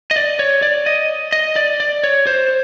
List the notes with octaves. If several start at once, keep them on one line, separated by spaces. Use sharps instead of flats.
D#5
D5
C#5
D5
D#5
D#5
D5
D5
C#5
C5